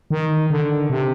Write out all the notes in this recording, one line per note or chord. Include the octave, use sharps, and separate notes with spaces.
D#3
D3
C3